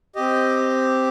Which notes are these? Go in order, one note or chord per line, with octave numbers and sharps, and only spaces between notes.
C4 G4 D#5